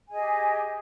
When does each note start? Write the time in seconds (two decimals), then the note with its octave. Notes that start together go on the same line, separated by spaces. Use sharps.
0.06 G#5
0.10 G#4
0.13 D#5
0.16 G4